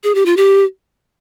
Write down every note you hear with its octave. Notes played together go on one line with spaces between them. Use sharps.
G#4
G4
F4
G4